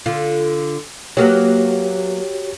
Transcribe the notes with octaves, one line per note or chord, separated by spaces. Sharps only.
D3 F4
F#3 A#3 B3 F#4 G4 C#5